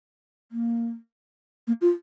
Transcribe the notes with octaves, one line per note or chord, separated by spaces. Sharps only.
A#3
A#3
F4